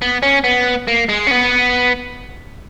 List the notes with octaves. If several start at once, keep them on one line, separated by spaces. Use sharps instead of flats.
B3
C#4
B3
A#3
G#3
C#4
B3